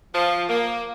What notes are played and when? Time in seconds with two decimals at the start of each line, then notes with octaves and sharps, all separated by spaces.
0.14 F3
0.48 A#3